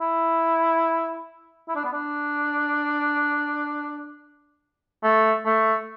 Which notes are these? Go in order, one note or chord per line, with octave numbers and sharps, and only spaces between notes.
E4
E4
D4
B3
D4
A3
A3